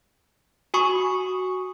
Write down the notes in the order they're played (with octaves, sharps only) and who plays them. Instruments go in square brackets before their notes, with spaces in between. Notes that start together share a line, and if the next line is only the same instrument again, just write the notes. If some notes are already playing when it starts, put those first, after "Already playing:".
[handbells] F#4 G#5 B5 C#6 D#6